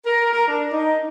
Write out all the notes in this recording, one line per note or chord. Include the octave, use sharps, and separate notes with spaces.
A#4
A#4
D4
D#4